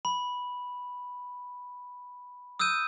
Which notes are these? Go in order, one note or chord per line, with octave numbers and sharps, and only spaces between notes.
B5
D#6 E6 F#6 G6 D#7